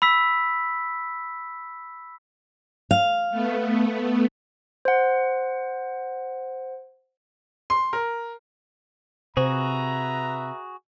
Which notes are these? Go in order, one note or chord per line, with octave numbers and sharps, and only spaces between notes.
B5 E6 B6
F5
A3 B3
C5 F#5
C6
A#4
C3 F#4 G#4 B4 C5 E5 A#5